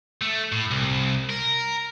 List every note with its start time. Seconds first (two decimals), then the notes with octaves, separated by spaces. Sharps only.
0.22 A3
0.52 A2
0.71 C2
1.30 A#4